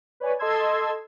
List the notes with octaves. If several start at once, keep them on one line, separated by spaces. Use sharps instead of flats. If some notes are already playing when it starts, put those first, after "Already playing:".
B4 C#5 D5 G#5
A4 D#5 A5 C6 E6 G#6